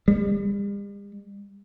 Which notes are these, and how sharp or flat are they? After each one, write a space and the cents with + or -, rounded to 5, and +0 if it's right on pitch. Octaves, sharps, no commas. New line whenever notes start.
G3 +45